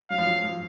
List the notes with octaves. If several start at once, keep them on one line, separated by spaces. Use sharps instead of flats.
F#3 F5
F3
F#3
F3